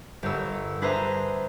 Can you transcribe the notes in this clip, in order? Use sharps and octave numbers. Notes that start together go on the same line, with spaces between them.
G1 G4 A#4 C#5 E6
D4 G#4 B4 C5 E5 A#5